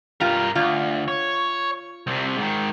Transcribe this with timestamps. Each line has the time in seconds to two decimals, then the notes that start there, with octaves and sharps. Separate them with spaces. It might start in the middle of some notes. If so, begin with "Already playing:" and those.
0.21 G2 G3 F4 A#4
0.55 D2 F4
1.08 C#5
2.07 C2 C3
2.38 G#2 D#3